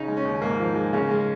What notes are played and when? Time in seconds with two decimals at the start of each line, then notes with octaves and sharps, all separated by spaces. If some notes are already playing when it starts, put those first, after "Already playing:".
Already playing: C#3 D#4
0.08 G#3
0.17 C#4
0.25 D#2
0.42 G#2 A#3
0.60 F3
0.76 G#3
0.93 C#3
1.11 G#3